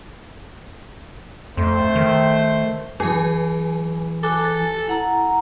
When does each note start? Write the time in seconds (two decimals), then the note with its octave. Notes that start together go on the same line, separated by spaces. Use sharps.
1.57 F2 A3 C5
1.95 D#3
3.00 E3 F#3 G#4 G#5
4.23 A4 G#5 D6 F#6
4.45 A6
4.87 E4 F#5 A#5